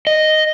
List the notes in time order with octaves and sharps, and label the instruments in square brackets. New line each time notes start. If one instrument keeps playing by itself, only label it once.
[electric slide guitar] D#5